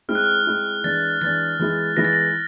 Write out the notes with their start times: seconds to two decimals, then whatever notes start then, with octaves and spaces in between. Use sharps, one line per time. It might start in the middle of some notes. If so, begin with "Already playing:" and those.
0.09 G#3 C4 E4 G#4 F6
0.15 F#6
0.24 F6
0.46 G#3 C4 E4 G#4
0.84 E3 G#3 B3 D4 A6
1.22 E3 G#3 B3 D4 A6
1.59 E3 G#3 B3 E4
1.96 E3 G#3 B3 E4 A#6
2.05 A6
2.13 A#6